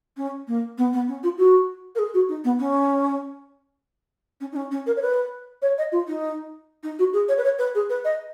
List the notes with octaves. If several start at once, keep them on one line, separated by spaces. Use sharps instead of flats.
C#4
A#3
B3
B3
C#4
F4
F#4
A#4
G#4
F#4
D#4
B3
C#4
C#4
D#4
C#4
C#4
A#4
C#5
B4
C#5
D#5
F4
D#4
D#4
F#4
G#4
C#5
B4
C#5
B4
G#4
B4
D#5